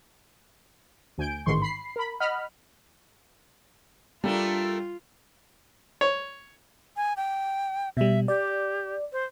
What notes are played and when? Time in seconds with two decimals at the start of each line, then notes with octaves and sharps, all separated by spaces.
1.18 D2 G#5 G6 D7
1.46 A1 G#2 D#3 C6 C#6
1.62 B5 C7
1.96 A#4 B5
2.20 D#5 F#5 B5 F6
4.24 G3 A3 A#3 D4 F4
6.01 C#5
6.97 G#5
7.17 G5
7.97 B2 G3 E5
8.28 G4 D5
9.12 C5